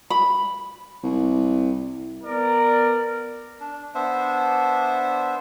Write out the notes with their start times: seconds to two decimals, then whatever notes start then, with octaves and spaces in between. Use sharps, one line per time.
0.10 B5
1.03 C2
2.23 B3 A#4 D5
3.60 D4
3.95 B3 D4 C5 E5